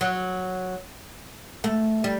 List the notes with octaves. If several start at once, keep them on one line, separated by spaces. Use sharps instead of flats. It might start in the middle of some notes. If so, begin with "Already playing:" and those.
F#3
A3
G3